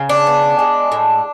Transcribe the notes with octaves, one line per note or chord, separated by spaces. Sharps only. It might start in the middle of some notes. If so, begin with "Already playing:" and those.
Already playing: C#3
D4
B3
G#3
A2